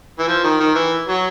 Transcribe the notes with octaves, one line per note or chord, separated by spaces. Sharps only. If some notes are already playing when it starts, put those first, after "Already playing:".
E3
F3
D#3
D#3
E3
F#3